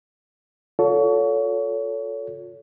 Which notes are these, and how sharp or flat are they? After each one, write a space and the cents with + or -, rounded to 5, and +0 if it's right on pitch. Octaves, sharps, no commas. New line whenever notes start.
F4 +40 A4 +0 C#5 +30